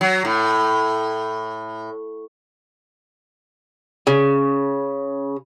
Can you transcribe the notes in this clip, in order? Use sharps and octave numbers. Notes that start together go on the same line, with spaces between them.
F#3
A2
C#3